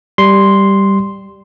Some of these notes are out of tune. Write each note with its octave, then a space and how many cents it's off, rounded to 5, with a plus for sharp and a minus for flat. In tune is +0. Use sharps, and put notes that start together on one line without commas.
G3 +0 C6 +0